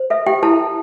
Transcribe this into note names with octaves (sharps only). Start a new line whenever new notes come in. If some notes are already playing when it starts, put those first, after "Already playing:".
Already playing: C5
A4 E5
G4 G5
E4 A4 A5